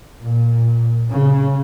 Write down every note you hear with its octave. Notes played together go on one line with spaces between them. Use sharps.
A#2
C#3